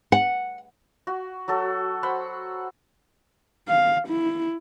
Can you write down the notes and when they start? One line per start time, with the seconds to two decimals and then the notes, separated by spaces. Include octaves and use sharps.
0.12 F#5
1.07 F#4
1.48 F#3 F#4 A4
2.03 C5 F#5 B5
3.69 F5
4.08 E4